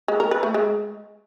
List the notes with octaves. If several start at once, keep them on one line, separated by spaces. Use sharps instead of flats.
G#3
A#4
B4
A3
G#3